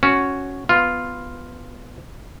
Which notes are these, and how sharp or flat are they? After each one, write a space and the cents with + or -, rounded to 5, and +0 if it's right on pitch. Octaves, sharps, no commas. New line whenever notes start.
C#4 +0 F#4 +0
B3 +10 F4 +0